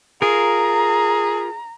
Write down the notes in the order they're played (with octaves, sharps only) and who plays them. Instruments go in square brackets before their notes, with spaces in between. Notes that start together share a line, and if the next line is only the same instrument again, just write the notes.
[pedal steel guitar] F4 A#4 [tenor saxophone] G#4 [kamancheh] A#5